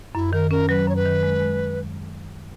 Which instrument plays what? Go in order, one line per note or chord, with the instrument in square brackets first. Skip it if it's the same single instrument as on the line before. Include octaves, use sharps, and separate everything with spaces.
[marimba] F#2 [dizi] E4
[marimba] D#3 [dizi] A#4
[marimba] C#4 [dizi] A#4
[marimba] F#3 [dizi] B4
[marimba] F#2 [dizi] C#5
[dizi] B4
[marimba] D#3
G#3
G#3